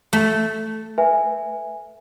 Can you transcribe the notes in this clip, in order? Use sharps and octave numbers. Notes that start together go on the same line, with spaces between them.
A3
B4 E5 G#5